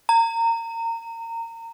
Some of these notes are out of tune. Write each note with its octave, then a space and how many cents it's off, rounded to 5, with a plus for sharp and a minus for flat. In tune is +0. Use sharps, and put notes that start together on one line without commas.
A#5 -25